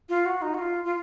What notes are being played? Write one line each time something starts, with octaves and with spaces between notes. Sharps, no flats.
F4
F#4
D#4
F#4
F4
F4